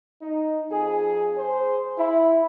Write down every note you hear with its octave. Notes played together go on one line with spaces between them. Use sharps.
D#4
F2 G#4
G#4 C5
E4